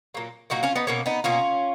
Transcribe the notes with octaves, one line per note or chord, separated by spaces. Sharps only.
A#2 F#3 A#3
A#2 F#3 A#3 D#4 F#4
C#4 F4
B3 D#4
B2 A#3 C#4
B3 D#4
B2 A#3 C#4 F4